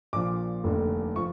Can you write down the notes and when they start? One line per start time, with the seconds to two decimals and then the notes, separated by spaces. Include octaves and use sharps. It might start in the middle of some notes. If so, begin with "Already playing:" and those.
0.13 A#1 A#2 F3 D6
0.64 F1 D#2 D3
1.16 F3 C#6